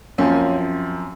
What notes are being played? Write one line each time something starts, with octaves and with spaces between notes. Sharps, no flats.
F#2 F3 A#3 C4 C#4